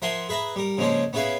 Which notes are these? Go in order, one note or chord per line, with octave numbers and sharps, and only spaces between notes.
F3 A#4 E5 F#5 G#5 C6
G#4 B4 E5 A#5
G3 A#4
C#3 F3 G#3 A#3 C4 C#4
B3 C#4 E4 G#4 B4 F5